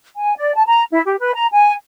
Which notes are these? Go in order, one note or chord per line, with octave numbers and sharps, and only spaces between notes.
G#5
D5
A5
A#5
E4
G4
B4
A#5
G#5